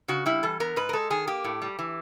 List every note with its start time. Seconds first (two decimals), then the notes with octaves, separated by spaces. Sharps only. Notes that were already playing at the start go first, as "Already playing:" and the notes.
0.08 C#3 F#4
0.26 G3 E4
0.43 E3 A4
0.60 B3 A#4
0.76 G#2 B4
0.89 A#4
0.93 G#3 A4
1.10 D#3 G#4
1.27 A#3 G4
1.44 A2
1.62 G3
1.79 E3